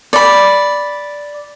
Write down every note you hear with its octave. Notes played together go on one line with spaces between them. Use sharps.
D5 B5